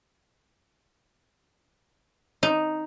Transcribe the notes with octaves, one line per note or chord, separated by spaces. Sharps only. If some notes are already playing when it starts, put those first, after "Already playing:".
D#4